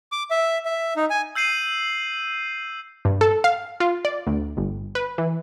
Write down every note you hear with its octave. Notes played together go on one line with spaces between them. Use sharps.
D6
E5
E5
D#4
G#5
E6 G6 C7 D#7 F#7
G2
A4
F5
F4
D5
D2
G1
B4
E3